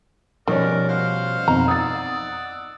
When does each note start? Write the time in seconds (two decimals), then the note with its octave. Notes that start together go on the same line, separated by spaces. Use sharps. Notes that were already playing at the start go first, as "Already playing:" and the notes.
0.48 B2 D#3 F3 G3 C#4 A#4 D5
0.89 C5 F5 F#5
1.48 F2 B2 D#4 A#5
1.68 D5 F#5 D#6 E6 A6